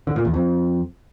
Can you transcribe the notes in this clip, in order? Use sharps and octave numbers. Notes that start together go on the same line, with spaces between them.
D3
A#2
E2
F2